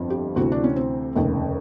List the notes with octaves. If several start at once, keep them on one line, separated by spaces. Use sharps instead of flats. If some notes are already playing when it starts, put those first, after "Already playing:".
Already playing: G1 F2 F3
G4
D2 C3 E3 F#4
D4
C#4
C4
F1 D#2 C#3